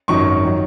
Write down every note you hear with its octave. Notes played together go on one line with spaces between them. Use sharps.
G#1 F#2 D#3 F#3 C#6
D#3 F#3